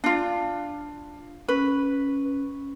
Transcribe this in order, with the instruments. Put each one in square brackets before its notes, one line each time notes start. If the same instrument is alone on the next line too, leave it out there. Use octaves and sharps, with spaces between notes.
[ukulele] D4 F4
[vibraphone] C#4 [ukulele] B4